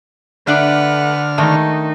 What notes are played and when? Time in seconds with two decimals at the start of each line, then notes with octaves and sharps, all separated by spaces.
0.47 D3 A3 D4 B4 D5 F#5 F6
1.38 D#3 G#3 A3 D4 D#4